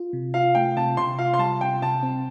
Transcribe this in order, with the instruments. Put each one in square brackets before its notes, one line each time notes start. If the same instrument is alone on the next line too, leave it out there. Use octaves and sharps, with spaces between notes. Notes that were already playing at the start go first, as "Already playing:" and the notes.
Already playing: [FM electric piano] F4
C3
[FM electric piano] F4 [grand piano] F5
[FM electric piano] A3 [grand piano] G5
[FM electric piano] C3 [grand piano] A5
[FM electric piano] C3 [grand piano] C6
[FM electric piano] F4 [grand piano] F5
[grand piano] C6
[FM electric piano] G3 [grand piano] A5
[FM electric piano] C3 [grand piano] G5
[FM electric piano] C3 [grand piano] A5
[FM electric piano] C4